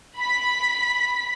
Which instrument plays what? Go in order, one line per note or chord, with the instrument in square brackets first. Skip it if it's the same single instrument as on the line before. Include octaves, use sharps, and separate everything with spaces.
[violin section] B5 B6